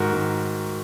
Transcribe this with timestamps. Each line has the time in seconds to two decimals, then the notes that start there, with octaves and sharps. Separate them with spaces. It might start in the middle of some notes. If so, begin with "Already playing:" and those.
Already playing: G#2 D#3 F#4 A#4
0.13 G#2 D#3